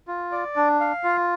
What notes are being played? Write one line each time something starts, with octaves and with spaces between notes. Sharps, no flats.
F4
D5
D4
F5
F4